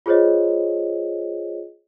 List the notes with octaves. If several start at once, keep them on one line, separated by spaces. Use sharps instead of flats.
F4 G#4 C5 C#5 D#5